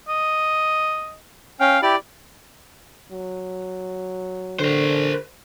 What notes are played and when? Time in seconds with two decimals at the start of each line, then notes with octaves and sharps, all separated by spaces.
0.08 D#5
1.60 C#4 F5 G5
1.82 E4 G4 D5
3.12 F#3
4.59 D3 A#4 C5